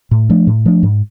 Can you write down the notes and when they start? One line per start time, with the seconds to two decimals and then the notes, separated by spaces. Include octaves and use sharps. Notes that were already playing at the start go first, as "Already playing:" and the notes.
0.11 A2
0.29 F3 A3 D4
0.47 A2
0.66 F3 A3 D4
0.83 G#2